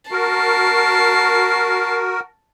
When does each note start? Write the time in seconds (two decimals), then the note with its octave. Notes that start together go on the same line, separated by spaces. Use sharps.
0.11 F#4 A#4 A5 C7